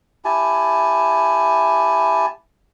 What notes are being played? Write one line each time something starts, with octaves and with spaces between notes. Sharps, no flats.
E4 G4 G#5 A5